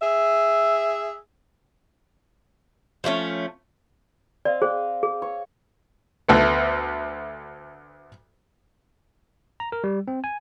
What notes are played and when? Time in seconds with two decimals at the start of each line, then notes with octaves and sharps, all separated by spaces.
0.02 G#4 E5
3.04 F3 G#3 A3 C#4
4.45 C4 D5 D#5 F5
4.62 G#4 C5 G5
5.03 G#4
5.22 C#5
6.29 D2 A3 B3
9.60 A#5
9.72 A#4
9.84 G3
10.08 C4
10.24 G#5